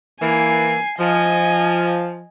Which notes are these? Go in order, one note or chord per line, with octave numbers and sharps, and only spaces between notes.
E3 A#3 G#5 C7
F3 D#5 G#5